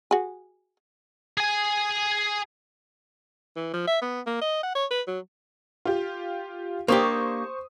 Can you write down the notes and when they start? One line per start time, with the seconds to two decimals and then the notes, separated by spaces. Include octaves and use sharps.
0.11 F#4 G#4
1.38 G#4 G#5
3.56 E3
3.73 F3
3.87 E5
4.02 B3
4.27 A#3
4.41 D#5
4.63 F#5
4.75 C#5
4.91 B4
5.07 F#3
5.85 F4 G4
6.88 A#3 D4 G4 C5 C#6 D#6